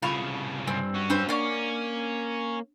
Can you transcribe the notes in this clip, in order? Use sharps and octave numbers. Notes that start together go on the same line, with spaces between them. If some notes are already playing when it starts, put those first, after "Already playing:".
C2 C#3 F4 A4 F5 B5 C#6
G2 C4 G#5
C#4 F#4
C4 D4 B4 C5
A#3 C#4 D5 F#5 C#6 F6